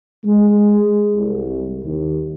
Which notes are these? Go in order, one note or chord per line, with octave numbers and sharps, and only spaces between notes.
G#3
C2
D#2